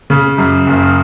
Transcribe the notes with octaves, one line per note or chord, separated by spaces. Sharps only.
C#3
F#2
F#1